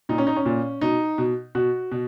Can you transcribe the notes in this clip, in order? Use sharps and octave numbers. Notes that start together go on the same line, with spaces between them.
A#2 D#4
C#4
D#4
C#4
A#2
B2 D#4
B2
B2 F#4
B2